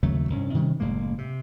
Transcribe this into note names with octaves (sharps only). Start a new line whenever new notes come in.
D#2 C#3 F#3 A3
C2 G2 C#4
C3 D#3 G3 C#4
F#1 A2 G#3 A#3
C3